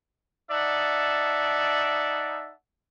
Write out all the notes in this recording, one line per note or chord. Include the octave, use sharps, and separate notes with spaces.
D#4 D5 E5 F#5 A5